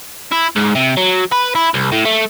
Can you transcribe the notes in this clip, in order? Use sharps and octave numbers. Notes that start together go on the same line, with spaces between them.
E4
G#2
C3
F#3
B4
E4
C2
A2
A3